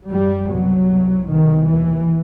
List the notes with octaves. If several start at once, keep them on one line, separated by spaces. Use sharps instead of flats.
F#2 G3
C2 B2 F#3
C2 C3
C2 B2 D#3
D#2 E3